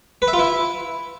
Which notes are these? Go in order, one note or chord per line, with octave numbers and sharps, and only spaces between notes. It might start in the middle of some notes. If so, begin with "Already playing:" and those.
B4
E5
F4
E4